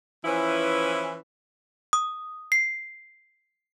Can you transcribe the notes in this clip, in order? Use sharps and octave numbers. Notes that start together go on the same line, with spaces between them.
E3 F3 C#4 E4 B4
D#6
C7